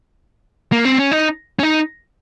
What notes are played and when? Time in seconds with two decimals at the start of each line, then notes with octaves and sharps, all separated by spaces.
0.72 A#3
0.85 C4
0.98 C#4
1.12 D#4
1.59 C#4
1.63 D#4